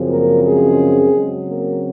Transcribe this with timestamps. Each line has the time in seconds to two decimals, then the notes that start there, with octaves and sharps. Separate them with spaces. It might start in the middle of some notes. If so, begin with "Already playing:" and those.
Already playing: F#2 C#3 F3 C4
0.09 A#3 A#4
0.44 G#3 G#4
1.14 C#3 F#3 C4
1.48 A#3 A#4